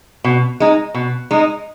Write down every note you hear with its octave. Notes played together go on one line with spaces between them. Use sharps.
B2
G#3 D#4
B2
G#3 D#4